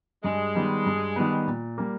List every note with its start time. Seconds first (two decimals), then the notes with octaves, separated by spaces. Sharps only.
0.24 G2 G#3
0.55 D#3 G3 B3
0.86 G2
1.16 D#3 G3 B3
1.47 A#2
1.78 G3 A#3